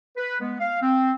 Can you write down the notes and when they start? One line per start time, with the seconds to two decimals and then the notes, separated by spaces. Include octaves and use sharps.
0.17 B4
0.41 G#3 B3
0.60 F5
0.82 C4